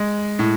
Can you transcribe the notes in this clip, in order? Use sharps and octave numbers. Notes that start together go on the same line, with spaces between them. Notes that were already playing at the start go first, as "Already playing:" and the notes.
Already playing: G#3
A2